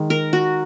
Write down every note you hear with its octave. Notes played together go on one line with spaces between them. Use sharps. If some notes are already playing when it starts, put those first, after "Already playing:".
Already playing: D#3 G#3
A#4
F#4